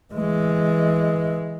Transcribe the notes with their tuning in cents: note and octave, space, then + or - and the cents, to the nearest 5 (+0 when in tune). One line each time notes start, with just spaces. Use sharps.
E3 -5 G#3 +0